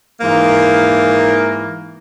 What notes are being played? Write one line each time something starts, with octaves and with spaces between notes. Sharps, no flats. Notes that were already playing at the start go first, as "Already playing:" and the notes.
G#2 E3 A#3 A#4